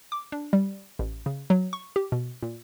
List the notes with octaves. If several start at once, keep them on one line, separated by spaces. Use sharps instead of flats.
D6
D4
G3
A1
C#3
F#3
C#6
G4
B2
A#2